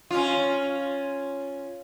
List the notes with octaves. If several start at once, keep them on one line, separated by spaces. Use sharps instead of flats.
C#4 F4